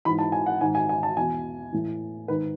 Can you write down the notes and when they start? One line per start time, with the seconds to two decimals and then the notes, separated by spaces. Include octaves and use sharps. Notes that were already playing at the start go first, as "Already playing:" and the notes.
0.05 G#2 E3 B5
0.19 A5
0.32 G#5
0.46 F#5
0.61 G#2 D#3 G#5
0.75 G#5
0.89 G#5
1.03 A5
1.17 E2 B2 G#5
1.72 A2 E3
2.28 G#2 D#3 B4